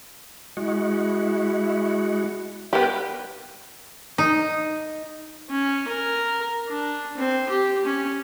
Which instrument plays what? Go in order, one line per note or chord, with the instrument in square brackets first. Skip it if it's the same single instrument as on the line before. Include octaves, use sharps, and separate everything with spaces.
[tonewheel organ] G#3 F#4 [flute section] E4 E5
[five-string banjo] B3 G4 [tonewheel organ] A#4 B4 G5 [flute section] G6
[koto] D#4
[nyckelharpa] C#4
A#4
D4
C4
G4
C#4